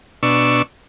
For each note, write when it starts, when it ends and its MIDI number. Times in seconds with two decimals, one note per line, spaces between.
0.23 0.62 47
0.23 0.62 62
0.23 0.62 85
0.23 0.62 88